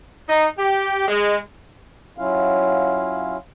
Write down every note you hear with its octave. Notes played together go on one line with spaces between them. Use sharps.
D#4
G4
G#3
F#3 C#4 E4 F4 F5